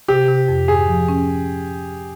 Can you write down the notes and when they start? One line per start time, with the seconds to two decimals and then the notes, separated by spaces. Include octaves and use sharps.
0.08 C3 G4
0.28 C3
0.48 F2
0.68 G#2 G#4
0.88 F3
1.09 C#4